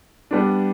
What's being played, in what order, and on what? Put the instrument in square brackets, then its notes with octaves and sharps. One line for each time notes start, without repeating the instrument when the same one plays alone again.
[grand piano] G3 B3 D4